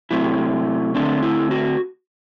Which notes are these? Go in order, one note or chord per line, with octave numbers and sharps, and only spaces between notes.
C3 F#3 A3 C4 E4
D3 A3 C4 D4
E4
F#4